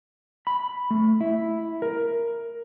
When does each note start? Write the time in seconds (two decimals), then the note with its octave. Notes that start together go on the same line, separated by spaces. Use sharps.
0.47 B5
0.91 A3
1.21 E4
1.82 A#4